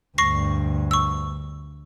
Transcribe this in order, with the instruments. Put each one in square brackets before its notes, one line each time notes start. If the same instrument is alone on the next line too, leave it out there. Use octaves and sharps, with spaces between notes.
[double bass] D2 G2 [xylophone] C#6 A#6 C7
[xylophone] C#6 E6